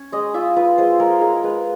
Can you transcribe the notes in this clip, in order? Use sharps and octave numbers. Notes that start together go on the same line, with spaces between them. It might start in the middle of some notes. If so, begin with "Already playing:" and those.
Already playing: C#4
G#3 D#5
F4 E5
F4 B4
G#3 C5
G#3 A#4
G#3 A#4
G#3 B4